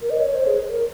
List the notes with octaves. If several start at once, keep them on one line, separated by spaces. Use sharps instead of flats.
A#4
D#5
C#5
C5
G#4
A#4